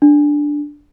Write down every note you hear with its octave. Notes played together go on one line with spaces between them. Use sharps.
D4